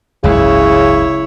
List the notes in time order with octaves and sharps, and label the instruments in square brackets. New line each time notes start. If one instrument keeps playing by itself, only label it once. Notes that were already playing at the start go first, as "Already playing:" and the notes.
[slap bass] F#1 C#2 G#2 [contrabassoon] C#3 [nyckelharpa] E4 C#5